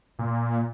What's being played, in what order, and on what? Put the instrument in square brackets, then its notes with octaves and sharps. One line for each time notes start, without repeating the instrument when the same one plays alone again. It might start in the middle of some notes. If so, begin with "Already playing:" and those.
[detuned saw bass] A#2